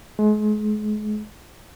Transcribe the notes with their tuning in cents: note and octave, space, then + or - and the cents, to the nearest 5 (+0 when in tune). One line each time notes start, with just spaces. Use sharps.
G#3 +35